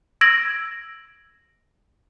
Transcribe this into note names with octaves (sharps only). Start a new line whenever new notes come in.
E6 G#6 A#6 D7 F#7